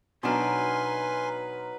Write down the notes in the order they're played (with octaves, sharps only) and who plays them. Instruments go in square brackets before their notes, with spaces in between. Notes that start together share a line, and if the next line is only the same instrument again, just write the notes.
[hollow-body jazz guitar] B2 D4 [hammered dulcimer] F#3 D#4 A#4 [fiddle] B4 [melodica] G#5 C6